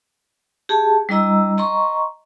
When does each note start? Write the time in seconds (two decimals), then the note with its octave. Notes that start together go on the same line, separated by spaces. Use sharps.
0.69 G4 G#4 A5
1.09 G3 D4 E4 D#5 A#5 E6
1.58 D#5 A#5 C6 C#6